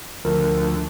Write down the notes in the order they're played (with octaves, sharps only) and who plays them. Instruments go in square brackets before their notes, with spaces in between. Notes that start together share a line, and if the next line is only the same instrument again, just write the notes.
[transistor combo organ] D2 [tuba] F3 [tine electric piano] A#4